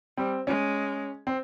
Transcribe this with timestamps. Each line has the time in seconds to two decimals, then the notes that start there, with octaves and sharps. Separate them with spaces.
0.17 G3 C4
0.47 G#3 C#4
1.27 C4